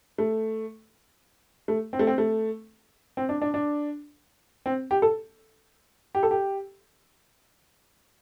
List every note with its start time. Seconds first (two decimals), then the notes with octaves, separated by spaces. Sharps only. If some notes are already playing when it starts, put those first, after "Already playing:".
0.18 A3
1.68 A3
1.93 C4
1.99 A3
2.07 C4
2.18 A3
3.17 C4
3.29 D4
3.42 D4
3.54 D4
4.66 C4
4.91 G4
5.02 A4
6.15 G4
6.23 A4
6.31 G4